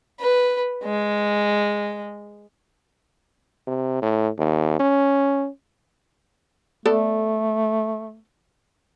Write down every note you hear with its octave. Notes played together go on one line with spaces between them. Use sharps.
B4
G#3
C3
A2
D#2
C#4
A3 B3 A4 D5